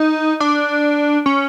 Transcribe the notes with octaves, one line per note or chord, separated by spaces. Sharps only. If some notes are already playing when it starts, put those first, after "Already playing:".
Already playing: D#4
D4
C#4